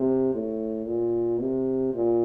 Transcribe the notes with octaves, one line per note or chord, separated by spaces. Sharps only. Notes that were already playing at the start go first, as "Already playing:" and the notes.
Already playing: C3
A2
A#2
C3
A#2